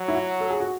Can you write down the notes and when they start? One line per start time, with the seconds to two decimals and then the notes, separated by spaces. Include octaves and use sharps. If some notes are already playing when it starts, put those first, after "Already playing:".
Already playing: F#3
0.08 E4
0.15 F#4
0.40 A4
0.50 G#4
0.60 F#4